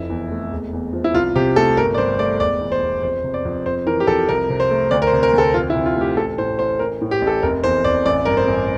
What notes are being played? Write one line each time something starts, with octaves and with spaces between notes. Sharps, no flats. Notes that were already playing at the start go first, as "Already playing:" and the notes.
Already playing: F1 F2 E4
E2
A3
E1
E2
F3
E4
C2 F4
C3 G4
A3 A4
G1 A#4
D5
G2 C5
A3 D5
E1 D5
E2
C5
E1
F2 C5
C3
D5
F2
F2 C5
E3 A#4
G4
F2 A4
C2 A#4
C3
C5
A3
D2 D5
A#4
C5
C3
A#4
D2 A4
F2 F4
E4
C3
F4
A3
G4
A1 A4
A2 C5
A1 C5
A1 A#4
A2
G4
A1
A4
F1 A#4
E2 C5
F1 D5
A1 D5
G2 A#4
C5
A1